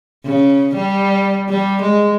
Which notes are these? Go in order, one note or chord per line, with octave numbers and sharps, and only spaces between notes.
C#3
G3
G3
G#3